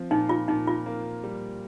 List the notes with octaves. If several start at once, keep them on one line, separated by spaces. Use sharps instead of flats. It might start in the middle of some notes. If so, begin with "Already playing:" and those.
Already playing: F3 C4
A#2 D#4
F4
A#2 D#4
F4
A#3
G3